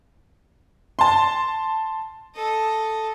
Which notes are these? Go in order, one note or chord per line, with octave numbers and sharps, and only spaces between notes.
A5 C6
A4 D#5